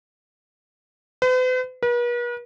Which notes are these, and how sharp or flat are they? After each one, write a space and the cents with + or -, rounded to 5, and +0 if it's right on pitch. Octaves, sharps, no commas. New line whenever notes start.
B4 +45
B4 -45